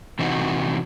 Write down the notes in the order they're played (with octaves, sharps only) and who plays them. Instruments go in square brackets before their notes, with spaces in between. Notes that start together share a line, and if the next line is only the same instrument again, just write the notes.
[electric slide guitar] C3 E3 C4 D#4 F#4